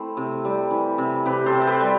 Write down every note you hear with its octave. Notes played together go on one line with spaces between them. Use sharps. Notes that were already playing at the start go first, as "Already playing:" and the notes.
Already playing: A3 C4 E4
C3
G3
E3
C3
C3 G4 B4
A4 C5
C3
A4
G4 B4
G3